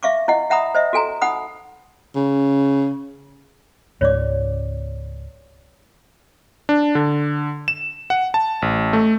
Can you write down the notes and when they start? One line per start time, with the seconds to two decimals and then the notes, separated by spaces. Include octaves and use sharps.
0.03 E5 F5 C#6 D6
0.28 E4 D#5 F#5
0.50 E5 F#5 A#5 B5 D#6
0.75 C5 D#5 E5
0.93 F#4 A4 G#5 A#5
1.22 D#4 F#5 B5 D#6
2.16 C#3
4.01 C#2 G#2 C#5 D5 D6
6.69 D4
6.95 D3
7.68 E7
8.10 F#5
8.34 A5
8.62 A1
8.93 A3